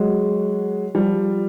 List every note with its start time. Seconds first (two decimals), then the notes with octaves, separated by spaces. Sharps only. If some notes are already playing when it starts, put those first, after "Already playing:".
Already playing: F#3 G#3
0.95 F3 G3